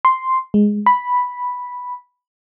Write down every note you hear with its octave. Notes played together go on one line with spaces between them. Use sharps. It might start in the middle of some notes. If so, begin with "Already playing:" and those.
C6
G#3
B5